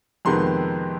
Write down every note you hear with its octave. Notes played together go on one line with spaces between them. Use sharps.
F2 C3 D#3 G#3 B3 C6